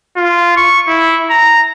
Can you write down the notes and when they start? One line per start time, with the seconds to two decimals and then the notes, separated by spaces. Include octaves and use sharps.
0.17 F4
0.57 C#6
0.87 E4
1.30 A#5